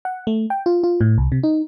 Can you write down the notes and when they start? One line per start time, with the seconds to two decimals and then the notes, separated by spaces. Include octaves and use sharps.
0.05 F#5
0.27 A3
0.50 G5
0.66 F4
0.83 F4
1.01 A2
1.18 C2
1.32 C3
1.43 D#4